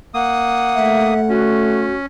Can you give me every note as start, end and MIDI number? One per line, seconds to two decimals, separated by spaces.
0.14 1.14 58
0.14 1.31 78
0.14 1.14 87
0.75 1.93 57
0.75 1.21 76
1.29 2.06 61
1.29 1.96 66